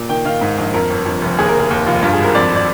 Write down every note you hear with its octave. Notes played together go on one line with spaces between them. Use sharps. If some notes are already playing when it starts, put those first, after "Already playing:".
Already playing: A#2
D#3 G5
D#3 F5
G#2
A#1
F2 A#4
G1
F2
F1
D#2 G#4
A#4
F1
G#4
D#2
F1 F4
G2 F4
G#4
G#1
A#4
F2 D5
D5